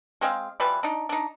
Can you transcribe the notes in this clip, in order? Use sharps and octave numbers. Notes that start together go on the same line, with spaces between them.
G#3 C4 G#4 F5
E3 F3 G3 B4
D4 D#4
D4 D#4